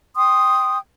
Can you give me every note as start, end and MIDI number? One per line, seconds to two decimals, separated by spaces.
0.16 0.77 79
0.16 0.77 84
0.16 0.77 87